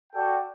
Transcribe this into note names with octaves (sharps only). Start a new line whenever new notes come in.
F#4 A4 D5 G5